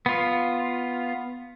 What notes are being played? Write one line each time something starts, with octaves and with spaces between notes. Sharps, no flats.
B3 F4